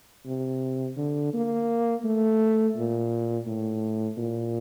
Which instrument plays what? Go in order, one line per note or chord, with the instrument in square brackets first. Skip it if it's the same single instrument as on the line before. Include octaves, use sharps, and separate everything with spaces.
[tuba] C3
D3
A#3
A3
A#2
A2
A#2